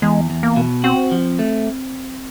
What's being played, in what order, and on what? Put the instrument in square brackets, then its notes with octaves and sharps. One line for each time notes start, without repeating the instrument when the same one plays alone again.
[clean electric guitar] E2 [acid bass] G#3
[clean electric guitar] E2
[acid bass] A#3
[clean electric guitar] B2
[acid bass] C4 [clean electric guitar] F#4
[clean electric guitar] F3
A3